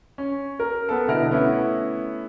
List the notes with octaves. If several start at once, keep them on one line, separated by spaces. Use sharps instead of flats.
C#4
A#4
B3 A4
B2 D3 E4 F6 A#6 D7
A3 B3 C#4 E4